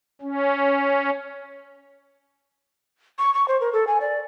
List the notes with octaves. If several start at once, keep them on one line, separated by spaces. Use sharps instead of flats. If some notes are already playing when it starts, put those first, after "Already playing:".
C#4
C#6
C#6
C5
A#4
A4
G#5
D5